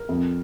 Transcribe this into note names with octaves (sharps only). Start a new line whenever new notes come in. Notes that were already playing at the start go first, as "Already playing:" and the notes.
Already playing: A#4
F2